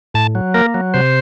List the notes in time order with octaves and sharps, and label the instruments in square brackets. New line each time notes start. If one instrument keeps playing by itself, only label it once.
[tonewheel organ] A2 A5
F#3
A#3 A#4
F#3
C3 C5